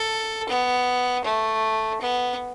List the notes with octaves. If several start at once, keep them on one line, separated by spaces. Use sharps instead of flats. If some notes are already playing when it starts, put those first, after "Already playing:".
Already playing: A4
B3
A3
B3